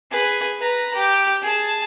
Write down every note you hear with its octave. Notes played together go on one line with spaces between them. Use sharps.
G#4 B4
B4 A#5
G4
G#4 A5